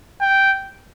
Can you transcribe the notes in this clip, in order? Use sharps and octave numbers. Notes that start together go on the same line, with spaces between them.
G5